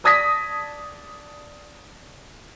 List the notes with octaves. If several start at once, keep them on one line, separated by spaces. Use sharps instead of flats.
D5 A5 D#6 G#6 A#6 B6